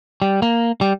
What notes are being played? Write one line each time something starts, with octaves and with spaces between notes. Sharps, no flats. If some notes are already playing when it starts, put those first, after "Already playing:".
G3
A#3
G3